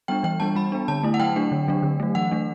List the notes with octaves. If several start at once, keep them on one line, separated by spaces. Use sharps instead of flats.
G3 B3 D4 G5
E3 G5
G3 B3 D4 A5
G3 B5
B3 D4
D3 A5
A3 E4
F#5
F#3 G5
A3 D4
D3
F#3 A3 D4
D3
F#3 A3
E3 F#5
A3 D4